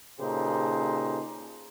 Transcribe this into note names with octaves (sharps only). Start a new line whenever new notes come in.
A#2 C#3 D#4 G4 A4 C5